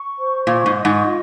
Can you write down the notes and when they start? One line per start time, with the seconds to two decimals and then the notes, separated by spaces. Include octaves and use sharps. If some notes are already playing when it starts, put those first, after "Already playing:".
Already playing: C#6
0.18 C5
0.46 A#2 C#6
0.66 G#2
0.75 D#5
0.85 G#2
1.03 F4